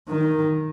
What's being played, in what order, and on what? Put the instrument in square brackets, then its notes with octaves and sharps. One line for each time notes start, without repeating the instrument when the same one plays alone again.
[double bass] D#3